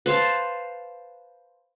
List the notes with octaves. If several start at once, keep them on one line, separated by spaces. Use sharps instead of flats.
B4 C5 F5 A5